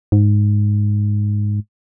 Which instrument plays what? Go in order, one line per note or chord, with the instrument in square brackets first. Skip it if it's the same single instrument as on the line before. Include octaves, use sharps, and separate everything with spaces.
[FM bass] G#2